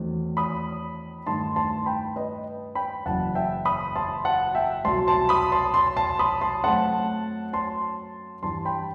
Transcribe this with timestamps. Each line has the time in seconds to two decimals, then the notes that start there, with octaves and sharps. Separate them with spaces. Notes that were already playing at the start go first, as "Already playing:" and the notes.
Already playing: E2 D#3 F#3 A3 C4
0.37 B5 D#6
1.26 G2 D#3 A3 A5 C6
1.56 A5 C6
1.86 G5 B5
2.16 B4 D#5
2.75 G5 B5
3.06 F#1 F#2 E3 F#5 A5
3.35 E5 G5
3.65 B5 D#6
3.96 A5 C6
4.25 F#5 A5
4.55 E5 G5
4.85 C2 B2 F#3 A5 C6
5.07 A5 C6
5.29 B5 D#6
5.52 A5 C6
5.74 A5 C6
5.97 A5 C6
6.19 B5 D#6
6.41 A5 C6
6.64 F#2 F#3 A3 C4 F#5 A5
7.53 A5 C6
8.43 G2 E3 G3 A5 C6
8.65 G5 B5